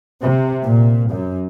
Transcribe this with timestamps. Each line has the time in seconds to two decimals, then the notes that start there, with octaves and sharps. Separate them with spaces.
0.20 C3
0.64 A#2
1.11 F#2